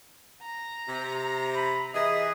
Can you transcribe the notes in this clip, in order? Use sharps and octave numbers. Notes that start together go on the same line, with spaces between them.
A#5
C3
B5
E3 G#4 D#5 E5